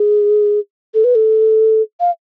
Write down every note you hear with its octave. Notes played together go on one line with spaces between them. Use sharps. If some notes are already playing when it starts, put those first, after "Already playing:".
Already playing: G#4
A4
B4
A4
F5